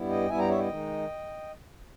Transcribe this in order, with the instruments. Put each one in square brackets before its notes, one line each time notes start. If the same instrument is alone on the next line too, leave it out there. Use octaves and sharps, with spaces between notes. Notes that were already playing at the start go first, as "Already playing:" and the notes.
Already playing: [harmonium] G2 G3 B3 E4
D#5 G5
G2 G3 B3 E4 E5 G#5
G5 A#5
C#5 E5
D#5 G5
D#3 G#3 D#4